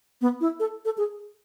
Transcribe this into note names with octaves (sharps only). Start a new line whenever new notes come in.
B3
E4
A4
A4
G#4